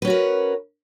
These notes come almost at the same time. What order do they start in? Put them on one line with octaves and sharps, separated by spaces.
B4 C#4 F#4 A#4